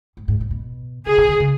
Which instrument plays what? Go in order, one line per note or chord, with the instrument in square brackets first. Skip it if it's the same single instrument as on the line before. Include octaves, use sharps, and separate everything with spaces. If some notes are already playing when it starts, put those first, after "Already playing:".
[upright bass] G#2
G#2
A#2
B2
[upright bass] C#3 [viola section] G#4
[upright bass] B2
D#3
C#3